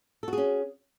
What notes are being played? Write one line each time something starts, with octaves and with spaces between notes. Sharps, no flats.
C#4 F#4 G#4 A4